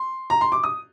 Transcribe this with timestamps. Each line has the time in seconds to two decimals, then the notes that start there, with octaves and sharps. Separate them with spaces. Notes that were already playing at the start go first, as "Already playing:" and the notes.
Already playing: C6
0.30 A#5
0.41 C6
0.52 D6
0.64 D#6